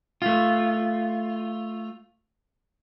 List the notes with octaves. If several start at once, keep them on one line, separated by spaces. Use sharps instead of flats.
A3 F4